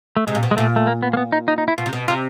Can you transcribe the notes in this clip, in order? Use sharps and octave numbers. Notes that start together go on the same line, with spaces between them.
A3
C3 G#3
A#2
B2
G#3
A#2 A3
A3
A#3
B3
A#3
B3
D#4
D#4
D#4
E4
B2 F4
C3
B2
C3 F4